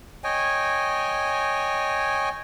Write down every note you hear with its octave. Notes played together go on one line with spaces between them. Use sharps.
C#5 D#5 G5 G#5